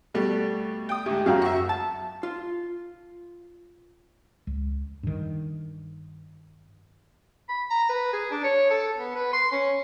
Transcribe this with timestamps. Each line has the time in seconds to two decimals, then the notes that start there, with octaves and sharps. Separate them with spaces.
0.14 B2 G3 A3
0.89 G5 D#6
1.06 D2 G#2 G4
1.26 F#2 C#3 F#4 F5 G5 A#5
1.42 F#4 E5
1.69 A5
2.23 F4
4.47 C#2
5.03 G2 D#3
7.49 B5
7.70 A#5
7.89 B4
8.13 G#4
8.31 D4
8.44 C#5
8.70 A4
8.97 B3
9.15 B4
9.33 C6
9.52 C#4